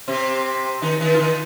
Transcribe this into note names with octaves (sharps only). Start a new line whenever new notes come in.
C3 C4
D#3 D#4
D#3 D#4
F4
D#3 D#4